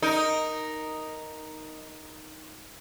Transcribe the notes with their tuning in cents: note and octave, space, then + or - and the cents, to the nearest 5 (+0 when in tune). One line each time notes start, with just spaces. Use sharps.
D#4 +0 A#4 +0